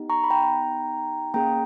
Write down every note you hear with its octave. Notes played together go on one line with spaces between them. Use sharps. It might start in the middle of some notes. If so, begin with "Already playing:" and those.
Already playing: B3 D#4 G4
A#5 C#6
B5
G5 A#5
A#3 C#4 G#4 G5 A#5